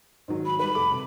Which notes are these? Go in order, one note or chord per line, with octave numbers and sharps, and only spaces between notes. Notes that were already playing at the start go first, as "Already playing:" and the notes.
G#2 D#3 F#3
B5
G3 B4 B5
F1 A4 D6
C3